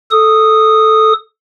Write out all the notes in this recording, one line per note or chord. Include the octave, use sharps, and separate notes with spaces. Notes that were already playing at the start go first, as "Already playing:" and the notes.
A4 D#6